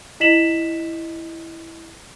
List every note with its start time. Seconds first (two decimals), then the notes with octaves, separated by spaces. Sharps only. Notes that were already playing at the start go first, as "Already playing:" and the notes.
0.20 E4 D#5 B6 E7 F#7